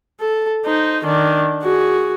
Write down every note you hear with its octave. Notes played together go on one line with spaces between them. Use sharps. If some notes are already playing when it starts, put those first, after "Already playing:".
A4
D#4 C5
D#3 D4
F#4 G#4